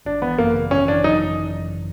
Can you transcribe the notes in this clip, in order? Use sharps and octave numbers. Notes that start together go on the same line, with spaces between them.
G#1 D4
E3 B3
F#2 A#3
C#3
G#1 C#4
E3 D4
F#2 D#4